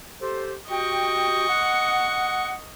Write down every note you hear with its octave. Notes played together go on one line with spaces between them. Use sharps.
G4 A4 C5
F#4 G4 D#5 G5 C#6
F#5